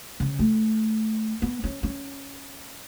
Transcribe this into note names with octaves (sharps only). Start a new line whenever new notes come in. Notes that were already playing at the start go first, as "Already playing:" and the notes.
C#3
A3
B3
C#4
C#4